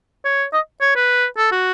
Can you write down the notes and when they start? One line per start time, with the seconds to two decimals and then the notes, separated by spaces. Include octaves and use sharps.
0.25 C#5
0.53 D#5
0.81 C#5
0.96 B4
1.38 A4
1.52 F#4